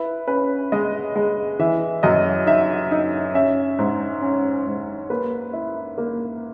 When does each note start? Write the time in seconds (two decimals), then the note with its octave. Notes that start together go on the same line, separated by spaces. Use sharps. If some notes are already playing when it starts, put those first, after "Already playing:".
Already playing: E4 B4
0.28 C#4 B4
0.72 G#3 D#5
1.16 G#3
1.59 E3 E5
2.03 F#2 D#5
2.47 D#4 E5
2.91 D#4
3.34 C#4 E5
3.79 G#2
4.22 C#4
4.67 G#2
5.10 A#3 B4
5.53 E4
5.98 A#3